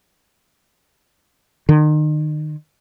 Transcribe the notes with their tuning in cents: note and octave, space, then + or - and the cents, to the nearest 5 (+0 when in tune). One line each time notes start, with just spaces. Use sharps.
D#3 -35